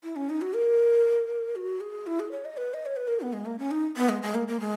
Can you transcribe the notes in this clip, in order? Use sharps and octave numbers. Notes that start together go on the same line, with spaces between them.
E4
C#4
D#4
F#4
A#4
F#4
G#4
E4
G#4
C#5
D#5
B4
D#5
C#5
B4
A#4
B3
G#3
A#3
C#4
D#4
B3
G#3
G#3
A#3
A#3
G#3